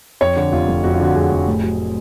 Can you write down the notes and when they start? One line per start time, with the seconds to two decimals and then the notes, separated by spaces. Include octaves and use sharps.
0.21 F2 C#5
0.36 D3
0.52 F1 F4
0.68 F1
0.84 F2 F#4
0.94 F4
1.00 D3 F#4
1.15 F1 G#4
1.31 F1
1.47 A2
1.63 F#3